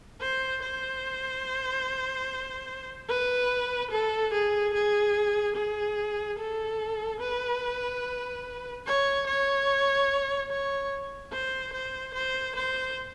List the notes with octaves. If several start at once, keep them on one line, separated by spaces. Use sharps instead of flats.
C5
C5
B4
A4
G#4
G#4
G#4
A4
B4
C#5
C#5
C#5
C5
C5
C5
C5